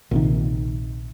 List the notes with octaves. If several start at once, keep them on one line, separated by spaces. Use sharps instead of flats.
A#1 C3 D#3